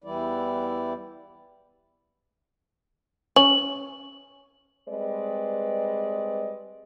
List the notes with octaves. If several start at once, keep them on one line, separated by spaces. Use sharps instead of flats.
E2 E3 G3 E4 D5
C#4 F#7
G3 G#3 C4 B4 D5 D#5